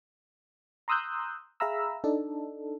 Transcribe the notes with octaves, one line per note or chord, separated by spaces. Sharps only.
A#5 C6 D#6 E6 F#6 G6
G#4 E5 F5 A#5 B5 E6
D4 D#4 A4